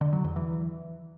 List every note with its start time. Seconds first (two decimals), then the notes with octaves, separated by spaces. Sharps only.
0.01 D3
0.13 F#3
0.24 E2
0.36 E3